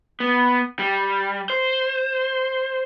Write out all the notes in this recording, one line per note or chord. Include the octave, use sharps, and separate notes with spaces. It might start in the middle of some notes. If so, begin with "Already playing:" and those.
B3
G3
C5